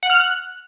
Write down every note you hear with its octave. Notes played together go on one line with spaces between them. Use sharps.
F#5
F6
F#6